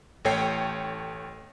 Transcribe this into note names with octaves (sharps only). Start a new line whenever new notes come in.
A1 A3 C#5 G5 C7